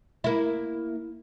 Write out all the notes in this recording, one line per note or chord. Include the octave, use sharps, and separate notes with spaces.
A#3 E4